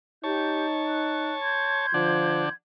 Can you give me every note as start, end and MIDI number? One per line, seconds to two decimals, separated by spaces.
0.24 1.35 63
0.24 0.66 67
0.24 1.86 73
0.24 1.86 81
0.24 0.66 91
0.86 1.35 90
1.42 2.53 84
1.42 2.53 91
1.42 2.53 92
1.94 2.49 50
1.94 2.45 53
1.94 2.49 62
1.94 2.49 78